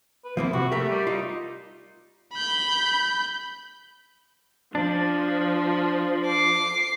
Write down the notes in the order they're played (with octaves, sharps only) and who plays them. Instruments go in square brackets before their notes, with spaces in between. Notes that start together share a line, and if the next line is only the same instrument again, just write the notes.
[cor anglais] B4
[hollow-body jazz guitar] F3 A#3 C4 [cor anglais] E4
[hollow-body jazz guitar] C3 [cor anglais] F#4
[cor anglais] A3 [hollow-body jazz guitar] G4 A#4 E5
[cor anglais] G3
[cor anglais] D#4 [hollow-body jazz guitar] F4
[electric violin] B5 G6
[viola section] F3 [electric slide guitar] D4
[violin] D6 C7